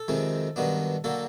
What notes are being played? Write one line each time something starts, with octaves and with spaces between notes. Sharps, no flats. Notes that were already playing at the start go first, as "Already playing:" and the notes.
Already playing: A4
F2 C3 D#3 G#3 C4
G2 D#3 F#3 B3 D4
D3 F#3 A#3 A4